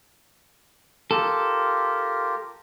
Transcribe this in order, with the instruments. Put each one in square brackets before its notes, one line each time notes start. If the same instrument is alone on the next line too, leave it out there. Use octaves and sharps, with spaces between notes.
[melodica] F4 G4 A#4 [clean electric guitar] A4